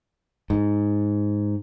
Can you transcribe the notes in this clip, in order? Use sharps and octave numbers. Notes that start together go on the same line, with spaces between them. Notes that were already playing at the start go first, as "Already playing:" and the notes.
G#2